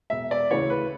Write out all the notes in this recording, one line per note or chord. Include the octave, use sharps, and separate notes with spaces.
E1 E5
D5
D2 C#3 E3 C#5
B4